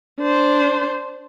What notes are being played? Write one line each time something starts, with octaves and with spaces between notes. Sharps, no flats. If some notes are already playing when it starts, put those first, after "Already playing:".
D4 C5